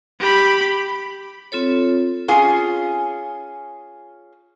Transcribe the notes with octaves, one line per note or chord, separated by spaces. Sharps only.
G4 B5
C4 F4 A4 C#5
C#4 F4 G#4